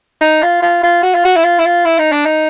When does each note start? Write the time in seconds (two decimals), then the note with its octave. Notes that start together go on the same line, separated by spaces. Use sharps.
0.21 D#4
0.43 F4
0.62 F4
0.83 F4
1.03 F#4
1.14 F4
1.25 F#4
1.36 E4
1.44 F4
1.59 E4
1.65 F4
1.85 E4
1.98 D#4
2.12 D4
2.26 D#4